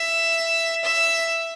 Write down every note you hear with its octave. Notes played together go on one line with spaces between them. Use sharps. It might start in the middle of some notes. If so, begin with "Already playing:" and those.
Already playing: E5
E5